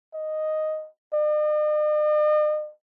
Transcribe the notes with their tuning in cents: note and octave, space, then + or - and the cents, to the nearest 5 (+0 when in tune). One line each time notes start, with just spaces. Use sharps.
D#5 +0
D#5 -45